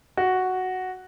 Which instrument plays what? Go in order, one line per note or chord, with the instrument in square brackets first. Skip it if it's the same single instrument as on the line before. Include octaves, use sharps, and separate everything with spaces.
[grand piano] F#4